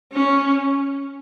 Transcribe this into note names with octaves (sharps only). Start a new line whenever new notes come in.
C#4